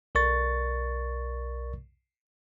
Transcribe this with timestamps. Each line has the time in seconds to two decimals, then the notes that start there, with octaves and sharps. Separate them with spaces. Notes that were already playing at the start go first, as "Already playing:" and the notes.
0.15 B1 A#4 D5 C#6 A6